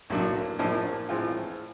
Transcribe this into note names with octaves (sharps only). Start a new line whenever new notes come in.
B1 A2 F#3 A#3 D4
A#1 A2 F3 A#3 D4
A2 E3 G#3 C4 F4